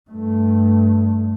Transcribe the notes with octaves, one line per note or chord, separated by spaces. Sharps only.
G2 A3